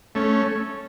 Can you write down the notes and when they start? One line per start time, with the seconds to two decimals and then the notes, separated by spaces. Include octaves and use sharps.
0.15 A3 C#4